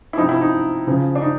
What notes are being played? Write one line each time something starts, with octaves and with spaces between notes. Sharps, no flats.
E4
C3 F3 D#4
E4
D#4
C#3 F3
D4
D#4